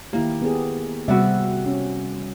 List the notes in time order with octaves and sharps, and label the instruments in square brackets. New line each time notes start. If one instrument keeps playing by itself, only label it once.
[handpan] D#3 E4 G4 [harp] A#3
[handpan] B3 G4 G#4
[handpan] C3 C4 E5 [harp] G3 B3 F#4
[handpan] C#4